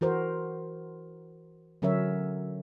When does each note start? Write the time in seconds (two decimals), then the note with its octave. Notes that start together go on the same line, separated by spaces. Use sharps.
0.01 E3 F#4 A#4 C5
1.82 D3 F#3 C#4 A#4 C#5 E5